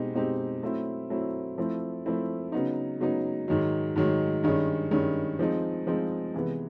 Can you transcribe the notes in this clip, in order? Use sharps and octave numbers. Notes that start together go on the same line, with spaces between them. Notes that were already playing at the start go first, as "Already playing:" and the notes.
Already playing: B2 G#3 C4 D#4 G4
B2 G#3 C4 D#4 G4
F#3 A3 C4 E4
F#3 A3 C4 E4
F3 A3 C4 E4
F3 A3 C4 E4
C#3 F#3 B3 D#4
C#3 F#3 B3 D#4
G#2 D#3 F#3
G#2 D#3 F#3
G2 D#3 G#3 C#4
G2 D#3 G#3 C#4
F3 G#3 C4 D#4
F3 G#3 C4 D#4
C3 E3 G#3 B3